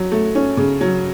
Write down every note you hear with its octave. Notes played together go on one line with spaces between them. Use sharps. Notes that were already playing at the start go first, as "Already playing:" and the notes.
Already playing: F#3
A3
C#4
C#3
F#3